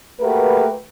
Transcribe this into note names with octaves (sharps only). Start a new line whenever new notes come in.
A3 A#3 F#4 G4 A#4 B4